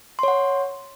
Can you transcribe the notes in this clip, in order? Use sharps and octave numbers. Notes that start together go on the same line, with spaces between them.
C#5 F#5 C6